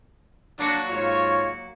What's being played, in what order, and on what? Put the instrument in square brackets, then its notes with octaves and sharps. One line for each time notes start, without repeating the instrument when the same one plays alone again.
[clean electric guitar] F#3 A#3 F#4 [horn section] D4
[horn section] G#2 F4 C#5